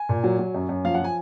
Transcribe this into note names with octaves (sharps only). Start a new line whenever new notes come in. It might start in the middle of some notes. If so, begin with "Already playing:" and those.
Already playing: G#5
A#2
F#3
F#3
F#2
F#2
F3 F5
F#5
F3 G#5